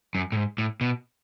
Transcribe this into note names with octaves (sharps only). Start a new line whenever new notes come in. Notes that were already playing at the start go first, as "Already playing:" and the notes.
F#2
A2
G#2
A2
B2